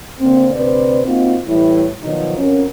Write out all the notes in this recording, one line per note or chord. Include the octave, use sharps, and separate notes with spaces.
D3 A#3 C4
D2 C3 B4 C5 D5
A#3 C4 D#4 F4 F#4
A2 E3 G3 E4
B2 D#3 F3 F#3 D#4
F2 C#4 F#4 A#4